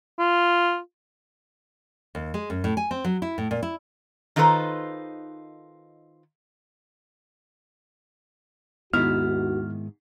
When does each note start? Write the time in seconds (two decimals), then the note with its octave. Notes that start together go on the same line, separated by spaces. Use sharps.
0.19 F4
2.15 D#2
2.34 G#3
2.50 F#2
2.64 A2
2.77 G#5
2.91 C4
3.04 F#3
3.22 E4
3.38 A2
3.51 A#2
3.63 E4
4.36 D#3 D#4 F4 A4 B4 C5
8.94 D#2 G#2 D#3 B3 E4 F#4 F6